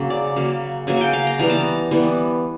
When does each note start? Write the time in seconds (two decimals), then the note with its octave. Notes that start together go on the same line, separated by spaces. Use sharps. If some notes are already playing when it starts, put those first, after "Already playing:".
Already playing: C#3 F#3 A#3
0.10 D5
0.36 C#3 F#3 A#3
0.87 C#3 F#3 A#3 G#5
1.01 G5
1.13 F5
1.27 A#5
1.39 E3 G3 B3 A#5
1.50 A5
1.61 A#5
1.91 E3 G3 B3